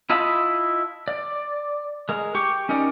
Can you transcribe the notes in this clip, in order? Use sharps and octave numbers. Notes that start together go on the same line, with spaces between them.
E4 F4 D#5 A5 B5
D5
G#3 A#4
G4 C#6
C#4 D#4 G4 A#4 D5